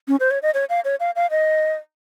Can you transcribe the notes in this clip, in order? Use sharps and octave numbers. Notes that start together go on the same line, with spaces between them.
C#4
C5
C#5
D#5
C#5
F5
C#5
F5
F5
D#5